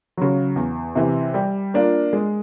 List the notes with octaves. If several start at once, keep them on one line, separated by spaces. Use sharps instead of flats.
C#3 F#3
E2
C3 E3
G3
A#3 D4 F4
G#3